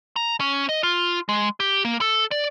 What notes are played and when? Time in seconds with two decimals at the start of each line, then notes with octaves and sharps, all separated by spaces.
0.16 A#5
0.40 C#4
0.69 D#5
0.83 F4
1.29 G#3
1.60 G4
1.85 A#3
2.01 A4
2.31 D5